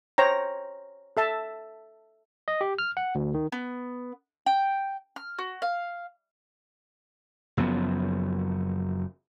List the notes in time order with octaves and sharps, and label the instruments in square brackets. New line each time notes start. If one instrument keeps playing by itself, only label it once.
[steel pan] C5 C#5 G5 A#5
A4 E5 A5
[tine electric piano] D#5
G4
F6
F#5
D2
D#3
[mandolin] B3
G5
F6
F#4
F5
[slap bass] F#1 F#2 F3 B3